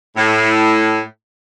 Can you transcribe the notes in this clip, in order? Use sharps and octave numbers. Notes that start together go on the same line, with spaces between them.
A2